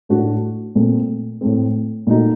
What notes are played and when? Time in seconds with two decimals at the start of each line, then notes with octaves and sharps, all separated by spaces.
0.09 A2 A3 D4 F#4
0.75 A#2 A3 C4
1.41 A2 A3 C4
2.07 A#2 A3 D#4 F#4